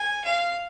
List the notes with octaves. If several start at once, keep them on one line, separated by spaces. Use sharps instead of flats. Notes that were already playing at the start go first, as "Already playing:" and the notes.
Already playing: G#5
F5